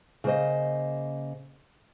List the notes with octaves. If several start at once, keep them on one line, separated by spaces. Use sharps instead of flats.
C#3 A#3 C5 D#5